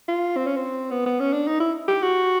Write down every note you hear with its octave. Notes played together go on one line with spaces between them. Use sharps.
F4
C4
C#4
C4
B3
B3
C#4
D4
D#4
E4
G4
F#4